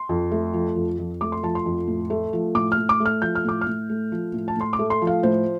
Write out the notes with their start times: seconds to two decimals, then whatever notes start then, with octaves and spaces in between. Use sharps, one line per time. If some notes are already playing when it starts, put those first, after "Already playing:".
Already playing: C6
0.09 F2
0.31 A3
0.54 F3
0.76 F2
0.99 F2
1.21 A3 D6
1.32 C6
1.43 F3 A5
1.55 C6
1.66 F2
1.87 A2
2.10 A3
2.33 F3
2.55 A2 D6
2.72 F6
2.77 A2
2.89 D6
3.00 A3
3.06 F6
3.22 F3 G6
3.35 F6
3.45 A2 D6
3.61 F6
3.67 A2
3.89 A3
4.12 F3
4.34 A2
4.48 A5
4.56 A2 C6
4.73 D6
4.79 A3
4.90 C6
5.02 F3
5.07 F5
5.23 A2 C5